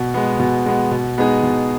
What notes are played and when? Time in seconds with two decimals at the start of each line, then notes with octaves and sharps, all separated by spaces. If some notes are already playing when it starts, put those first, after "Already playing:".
Already playing: B2
0.14 G#3 B3
0.39 B2
0.66 G#3 B3
0.91 B2
1.18 G#3 B3 D#4 G#4
1.43 B2